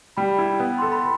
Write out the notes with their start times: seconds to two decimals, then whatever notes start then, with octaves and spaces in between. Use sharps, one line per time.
0.17 G3 G5 B5
0.38 E4
0.60 B3
0.78 A4 C6
0.92 B5